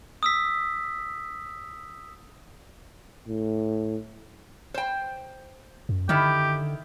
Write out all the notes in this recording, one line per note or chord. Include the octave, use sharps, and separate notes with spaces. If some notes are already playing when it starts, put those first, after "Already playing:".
D#6 E6 B6
A2
C5 G5
F#2
D3 D#3 E4 G4